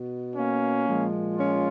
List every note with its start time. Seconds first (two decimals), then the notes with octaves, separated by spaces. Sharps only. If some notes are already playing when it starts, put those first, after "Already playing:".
Already playing: B2
0.36 A#3 C#4
0.87 A#2 F3 G#3
1.37 C#4 F4